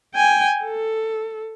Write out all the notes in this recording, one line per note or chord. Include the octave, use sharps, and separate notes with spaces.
G5 G#5
A4